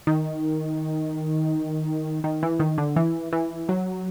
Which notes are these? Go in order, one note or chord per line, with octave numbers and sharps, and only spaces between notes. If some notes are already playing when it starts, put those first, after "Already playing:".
D#3
D#3
E3
D#3
D3
E3
E3
F#3